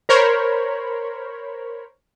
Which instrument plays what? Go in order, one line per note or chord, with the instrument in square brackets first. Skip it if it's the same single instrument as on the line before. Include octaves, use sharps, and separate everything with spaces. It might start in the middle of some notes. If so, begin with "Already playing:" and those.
[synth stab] A#4 C5 C#5 B5